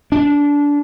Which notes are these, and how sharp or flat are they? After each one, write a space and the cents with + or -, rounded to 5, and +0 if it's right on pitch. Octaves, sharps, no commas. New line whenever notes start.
D4 -20